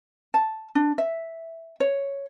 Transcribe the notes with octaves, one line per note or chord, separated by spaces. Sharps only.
A5
D4
E5
C#5